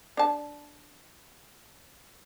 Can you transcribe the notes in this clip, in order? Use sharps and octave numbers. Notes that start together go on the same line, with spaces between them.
D4 A5